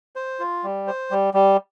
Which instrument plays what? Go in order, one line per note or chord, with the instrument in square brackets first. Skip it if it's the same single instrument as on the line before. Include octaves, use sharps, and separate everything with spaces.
[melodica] C5
F4
G3
C5
G3
G3